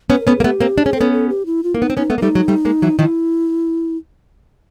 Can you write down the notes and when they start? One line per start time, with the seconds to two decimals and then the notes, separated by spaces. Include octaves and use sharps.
0.10 B3 C#4
0.12 B4
0.20 A#4
0.27 B3 C#4 A4
0.36 G#4
0.40 A#3
0.44 A3 B3 G4
0.60 A#3 C4
0.78 D4
0.84 C#4 G#4
0.93 C4 A4
1.01 B3 C#4
1.12 A4
1.29 G4
1.46 E4
1.63 F4
1.74 A#3 E4
1.80 B3 D#4
1.90 C4
1.97 B3 C#4 D#4
2.10 A3 B3
2.18 A#3
2.21 G3 A3 D#4
2.35 F#3 G#3
2.48 G3 A3
2.65 G#3 A#3
2.82 E3 F#3
2.99 D#3 F3 E4